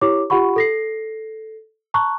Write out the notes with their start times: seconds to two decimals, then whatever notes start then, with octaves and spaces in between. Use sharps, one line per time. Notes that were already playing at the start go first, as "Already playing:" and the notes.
0.01 E4 G4 C#5 D6
0.30 F4 G4 F#5 B5 C#6
0.56 A4 A#6 C7
1.94 A5 A#5 C#6 F#6